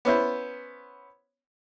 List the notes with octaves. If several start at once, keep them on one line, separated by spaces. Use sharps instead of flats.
B3 C#4 E4 C5